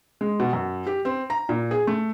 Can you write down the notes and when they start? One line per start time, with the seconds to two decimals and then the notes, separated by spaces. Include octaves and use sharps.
0.21 G#3
0.40 B2
0.53 F#2
0.86 G4
1.05 C4
1.30 A#5
1.49 A#2
1.71 G#4
1.87 A3